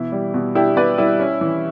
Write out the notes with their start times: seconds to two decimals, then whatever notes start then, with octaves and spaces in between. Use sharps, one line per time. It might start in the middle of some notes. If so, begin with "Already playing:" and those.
Already playing: B2 E3 E4
0.12 G3
0.34 B2
0.55 D4 E4 G4
0.77 B2 B4 D5
0.98 G3 E4
1.20 C#4
1.41 E3